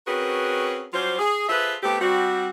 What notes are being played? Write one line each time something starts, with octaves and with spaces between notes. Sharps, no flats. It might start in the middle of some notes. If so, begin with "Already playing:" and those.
C4 C#4 F#4 G#4 A#4 B4
F#3 G3 C#4 F4 C5
G#4
F4 G#4 A4 B4 C5 E5
A3 B3 C4 G4
G3 C4 F#4